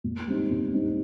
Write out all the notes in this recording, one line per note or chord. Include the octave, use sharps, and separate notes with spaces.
A#2
G3 C4 D#4
A#2
G3 C4 D#4